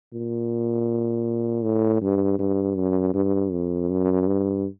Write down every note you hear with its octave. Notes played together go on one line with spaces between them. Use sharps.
A#2
A2
G2
G2
F#2
G2
F2
F#2
G2